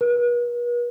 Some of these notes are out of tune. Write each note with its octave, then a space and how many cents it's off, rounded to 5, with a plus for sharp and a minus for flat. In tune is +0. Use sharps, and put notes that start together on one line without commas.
B4 -45